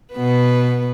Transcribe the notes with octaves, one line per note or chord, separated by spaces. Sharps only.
B2 B3 B4